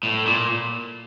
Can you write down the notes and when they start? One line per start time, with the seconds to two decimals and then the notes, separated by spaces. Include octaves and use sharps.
0.03 A2
0.26 A#2